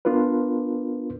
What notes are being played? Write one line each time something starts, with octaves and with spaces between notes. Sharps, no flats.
B3 D4 F4 A#4 B4